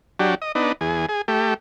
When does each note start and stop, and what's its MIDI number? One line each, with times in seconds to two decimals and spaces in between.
0.19 0.35 54
0.19 0.35 62
0.19 0.35 67
0.42 0.52 75
0.55 0.72 59
0.55 0.72 62
0.55 0.72 63
0.81 1.06 40
0.81 1.06 68
1.09 1.22 68
1.28 1.54 57
1.28 1.54 67